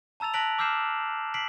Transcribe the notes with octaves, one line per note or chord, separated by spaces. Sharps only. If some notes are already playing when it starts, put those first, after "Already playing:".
A5 A#5 E6 A6 F7
A5 F#6 A#6 B6 D7 F#7
D6 E6 F6 G6 C7 E7
B6 C7 D7 F#7